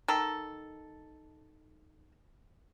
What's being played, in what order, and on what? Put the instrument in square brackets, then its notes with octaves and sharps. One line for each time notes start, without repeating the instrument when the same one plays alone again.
[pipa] D#3 A4